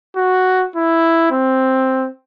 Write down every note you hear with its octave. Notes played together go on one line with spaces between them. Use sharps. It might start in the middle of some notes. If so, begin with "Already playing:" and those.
F#4
E4
C4